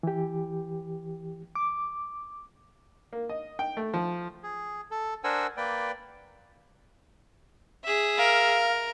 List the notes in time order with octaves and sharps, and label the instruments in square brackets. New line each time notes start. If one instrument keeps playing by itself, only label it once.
[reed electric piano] E3 G4
D6
[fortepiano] A#3
D#5
G5
A3
F3
[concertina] G#4
A4
D4 A#4 C5 F#5 G#5 E6
A#3 B4 D5 G5
[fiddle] G#4 E5
[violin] A#4 [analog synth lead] F5